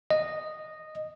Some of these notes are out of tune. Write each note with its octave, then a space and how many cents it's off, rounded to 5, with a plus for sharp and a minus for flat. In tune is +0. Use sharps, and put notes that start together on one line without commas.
D#5 -10